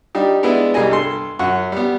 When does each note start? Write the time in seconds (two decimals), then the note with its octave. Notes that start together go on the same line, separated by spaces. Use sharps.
0.15 G3 D4 D#4 G4
0.43 G#3 B3 D4 E4 B4
0.74 C2 G3 A#3 G#4 D#5 G#5
0.90 G2 A4 C6
1.39 F#2 F#4 F#5 C#6
1.72 G3 B3